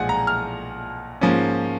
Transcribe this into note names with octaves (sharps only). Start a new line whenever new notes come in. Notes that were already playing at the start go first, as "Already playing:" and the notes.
Already playing: B1 A#2 F3 G#3 F#5 G#5
A#5
F6
G#2 F3 A#3 C#4